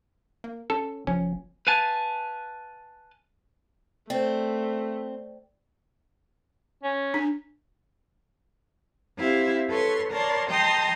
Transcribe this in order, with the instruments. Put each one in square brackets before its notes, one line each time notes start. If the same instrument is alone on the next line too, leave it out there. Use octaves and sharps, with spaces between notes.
[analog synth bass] A#3
[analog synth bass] C#4 [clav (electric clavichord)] A4
[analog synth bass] F#1 [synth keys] F3 [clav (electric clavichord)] C#4
[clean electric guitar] B4 F5 G#5 A5
[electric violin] A3 [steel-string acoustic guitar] C4 [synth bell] C5 D5
[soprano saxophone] C#4
[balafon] D4
[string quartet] C4 E4 G4 E5 F5
A4 B4 C#5 C6 C#6
A#4 C#5 D5 A5 C6
D#5 G5 A5 A#5 C6 D#6